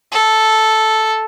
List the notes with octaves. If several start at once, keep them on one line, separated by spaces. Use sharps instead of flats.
A4